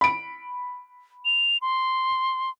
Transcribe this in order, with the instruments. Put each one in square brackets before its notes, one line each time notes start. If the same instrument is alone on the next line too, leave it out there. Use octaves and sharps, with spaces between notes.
[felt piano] B5 D7
[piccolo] F7
C6